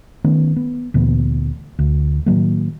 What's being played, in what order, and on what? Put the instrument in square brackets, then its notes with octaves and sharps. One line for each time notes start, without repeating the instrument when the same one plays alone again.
[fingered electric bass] D#3 A3 B3 C#4
B3
D2 A#2 E3 B3
D2
A2 D#3 F#3 A#3